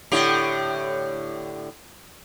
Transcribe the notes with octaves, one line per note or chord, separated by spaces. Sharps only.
A2 D3 G4